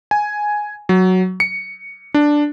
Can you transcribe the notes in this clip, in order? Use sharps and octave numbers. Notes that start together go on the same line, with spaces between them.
G#5
F#3
C#7
D4